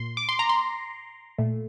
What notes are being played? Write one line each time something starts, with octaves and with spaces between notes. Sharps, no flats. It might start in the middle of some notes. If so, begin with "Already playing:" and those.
Already playing: A#2 C6
D6
C6
A#5
C6
A#2 A3